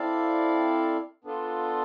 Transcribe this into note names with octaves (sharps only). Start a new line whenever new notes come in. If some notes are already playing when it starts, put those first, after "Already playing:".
Already playing: C4 E4 A4 D5 F5
B3 D4 F4 A4